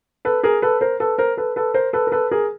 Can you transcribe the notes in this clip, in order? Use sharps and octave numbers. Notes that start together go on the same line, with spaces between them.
A4 B4
G#4 A#4
A4 B4
A#4 C5
A4 B4
A#4 C5
A4 B4
A4 B4
A#4 C5
A4 B4
A#4
A4 B4
G#4 A#4